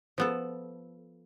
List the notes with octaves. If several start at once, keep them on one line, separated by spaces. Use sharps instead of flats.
F3 B3 A4